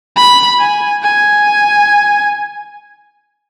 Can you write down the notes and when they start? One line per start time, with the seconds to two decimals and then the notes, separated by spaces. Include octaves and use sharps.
0.17 B5
0.60 G#5
1.03 G#5